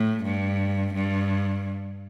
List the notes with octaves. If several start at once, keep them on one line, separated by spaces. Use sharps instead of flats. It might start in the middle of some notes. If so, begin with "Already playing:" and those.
Already playing: A2
G2
G2